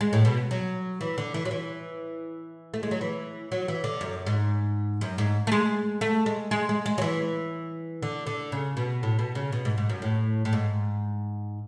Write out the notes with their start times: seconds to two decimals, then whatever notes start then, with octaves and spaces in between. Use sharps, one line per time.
0.01 G#3
0.13 A2
0.25 B2
0.51 F#3
1.01 E3
1.18 D3
1.34 E3
1.45 F#3
1.51 E3
2.74 A3
2.83 G#3
2.91 F#3
3.01 E3
3.52 F#3
3.68 E3
3.84 D3
4.01 F#2
4.26 G#2
5.01 F#2
5.18 G#2
5.47 A3
5.52 G#3
6.01 A3
6.26 G#3
6.51 G#3
6.69 G#3
6.86 G#3
6.98 F#3
7.01 E3
8.02 D3
8.27 D3
8.52 C#3
8.77 B2
9.03 A2
9.19 B2
9.35 C#3
9.52 B2
9.65 G#2
9.78 G#2
9.89 F#2
10.02 A2
10.45 A2
10.53 G#2